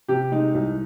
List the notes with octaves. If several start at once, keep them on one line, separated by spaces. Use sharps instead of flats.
C3 G4
G#3 D#4
C2